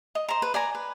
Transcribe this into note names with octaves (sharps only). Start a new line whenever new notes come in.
D#5
C5 A#5
B4
D5 G#5 A#5
B4